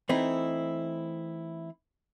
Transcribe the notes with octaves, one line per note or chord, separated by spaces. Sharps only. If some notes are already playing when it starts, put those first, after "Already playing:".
E3 A3 C4 D#4 E4